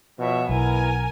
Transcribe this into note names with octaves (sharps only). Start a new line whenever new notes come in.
B2 F3 C#5 E5
B1 B3 E4 A#4 G#5